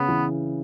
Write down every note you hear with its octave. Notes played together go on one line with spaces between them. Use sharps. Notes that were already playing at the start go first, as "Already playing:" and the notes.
Already playing: C#3 B3
E3